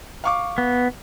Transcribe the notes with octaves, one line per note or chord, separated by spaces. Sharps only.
F5 C#6 D6
B3